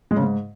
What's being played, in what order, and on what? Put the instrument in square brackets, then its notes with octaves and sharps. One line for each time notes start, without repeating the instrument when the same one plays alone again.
[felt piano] G#3
C#3
G#2